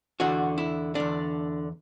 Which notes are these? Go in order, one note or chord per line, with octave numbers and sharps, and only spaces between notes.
E2 D3 F#4
E4
E2 D3 D4